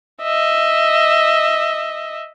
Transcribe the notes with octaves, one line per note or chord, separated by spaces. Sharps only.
D#5 E5